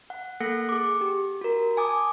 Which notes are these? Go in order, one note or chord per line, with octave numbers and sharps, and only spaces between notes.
F#5
A#3 A4 F#5 F#6 A#6 C#7
G#4 D6
G4
F#4 A#4
G#5 A5 D6 D#6